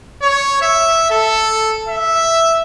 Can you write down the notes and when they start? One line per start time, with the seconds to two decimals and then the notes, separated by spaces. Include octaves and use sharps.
0.21 C#5
0.62 E5
1.10 A4
1.88 E5